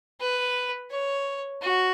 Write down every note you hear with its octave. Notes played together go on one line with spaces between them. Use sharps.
B4
C#5
F#4